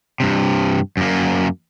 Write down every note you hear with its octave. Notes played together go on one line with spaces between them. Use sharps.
G2 C3
F#2 A#3